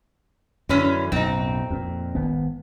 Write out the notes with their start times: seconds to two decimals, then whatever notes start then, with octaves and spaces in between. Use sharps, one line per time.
0.69 F#2 D3 E3 C#4
1.12 B1 F#2 A2 C4 D#4
1.70 F2 A#2
2.15 G#1 B3